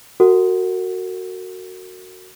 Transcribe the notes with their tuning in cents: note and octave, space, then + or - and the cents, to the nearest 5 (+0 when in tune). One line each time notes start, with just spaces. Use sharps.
F#4 +0 A#4 -35 F#5 +5